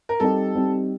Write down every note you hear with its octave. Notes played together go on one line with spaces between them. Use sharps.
A#4
G3 C4 D#4 G4 A4
G3 C4 D#4 G4